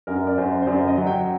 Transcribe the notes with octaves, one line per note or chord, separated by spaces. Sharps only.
F#2 A#4
D5
F#2 C5
C5
F#2 D5
D#5
F#3
G5